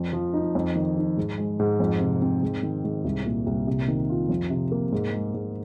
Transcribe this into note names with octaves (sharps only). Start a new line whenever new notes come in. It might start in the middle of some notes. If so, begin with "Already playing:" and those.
Already playing: F2
F3
D#4
F2
D#3
D#4
G#2
G#3
G#2
F2
C3
C4
G#2
D#3
G#2
C2
A#2
C2
C3
D#3
F4
F2
C3
A#3
G#2
G#3
G#2